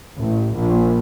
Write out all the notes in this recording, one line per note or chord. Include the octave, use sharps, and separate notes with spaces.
A1
A#1